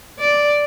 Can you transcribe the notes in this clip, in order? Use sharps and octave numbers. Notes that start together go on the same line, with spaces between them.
D5